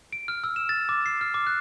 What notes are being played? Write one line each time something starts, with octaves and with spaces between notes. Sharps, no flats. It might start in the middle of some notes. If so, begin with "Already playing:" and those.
D7
F6
E6
E7
A6
D6
C7
F6
D6
F#6